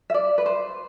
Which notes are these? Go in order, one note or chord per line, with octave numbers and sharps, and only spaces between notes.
E5
D5
B4
C5